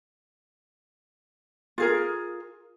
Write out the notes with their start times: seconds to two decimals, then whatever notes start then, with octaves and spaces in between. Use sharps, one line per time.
1.78 F4 G#4 A#4